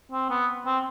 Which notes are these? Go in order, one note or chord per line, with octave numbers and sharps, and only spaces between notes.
C4
B3
C4